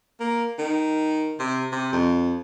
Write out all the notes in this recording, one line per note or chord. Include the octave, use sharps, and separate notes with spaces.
A#3
D#3
C3
C3
F2